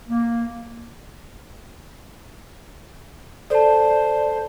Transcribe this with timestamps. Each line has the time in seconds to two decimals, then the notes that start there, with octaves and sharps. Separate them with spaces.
0.08 A#3
3.50 A4 C5 D5 A5